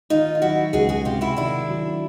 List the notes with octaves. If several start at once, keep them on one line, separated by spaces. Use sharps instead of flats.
D#3 D#4 F4
F4
F#3 E4 F#4
C#2 F#4 G#4
F#4 G#4
C3 F4 G4
E4 F#4
D#3 D4 E4
F#3